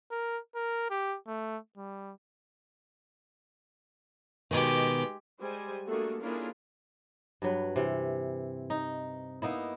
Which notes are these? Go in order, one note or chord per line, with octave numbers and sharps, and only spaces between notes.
A#4
A#4
G4
A3
G3
B2 D#3 G#3 G4
G3 G#3 C5 G#5
A3 A#3 D4 F#4 G#4 A4
A#3 C#4 D4 E4 F4 G#4
G2 F#3 B4
C3 E3
D#4
A#3 B3 D#4 E4